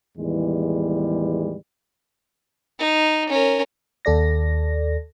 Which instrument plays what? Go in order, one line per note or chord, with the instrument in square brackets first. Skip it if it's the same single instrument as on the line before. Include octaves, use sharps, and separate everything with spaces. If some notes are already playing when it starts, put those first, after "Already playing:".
[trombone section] E2 A2 D#3 E3 G3 G#3
[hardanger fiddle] D#4
C#4 A#4
[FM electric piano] D#2 A4 D5 A#6